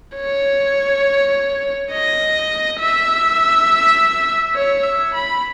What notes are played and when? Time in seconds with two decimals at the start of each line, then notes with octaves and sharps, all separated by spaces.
0.17 C#5
1.92 D#5
2.79 E5
4.56 C#5
4.84 E5
5.14 B5